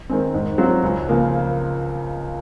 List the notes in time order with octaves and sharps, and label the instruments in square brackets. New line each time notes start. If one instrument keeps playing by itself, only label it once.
[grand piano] D#3 G#3 C4
G#2
F#3 C4 F4
C#2
C#3 F3 A#3